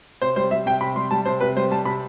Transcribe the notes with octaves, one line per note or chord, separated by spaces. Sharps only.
C3 C5
G3 C5
G3 E5
C3 G5
C3 B5
G3 C6
G3 A5
C3 C5
C3 B4
G3 C5
G3 A5
C3 B5